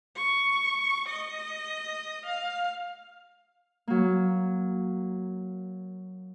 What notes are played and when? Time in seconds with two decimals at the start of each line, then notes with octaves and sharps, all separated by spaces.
0.16 C#6
1.08 D#5
2.26 F5
3.88 F#3 A#3